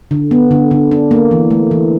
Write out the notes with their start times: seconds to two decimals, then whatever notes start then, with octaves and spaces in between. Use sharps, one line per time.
0.11 D3
0.31 B3
0.51 D3
0.71 D3
0.91 D4
1.11 A#3
1.31 E3
1.50 A3
1.71 E3